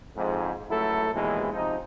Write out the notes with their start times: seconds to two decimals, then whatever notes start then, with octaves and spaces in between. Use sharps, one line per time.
0.16 F2 G#2
0.69 C#2 F#3 A3 E4 A4
1.14 A#1 D#2 B2 E3 G#3
1.54 C3 F3 D#4